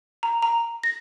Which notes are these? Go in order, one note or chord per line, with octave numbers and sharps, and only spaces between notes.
A#5
A#5
A#6